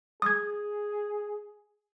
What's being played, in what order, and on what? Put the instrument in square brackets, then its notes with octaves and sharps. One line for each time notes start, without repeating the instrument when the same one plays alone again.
[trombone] G#4 [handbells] D#6 G#6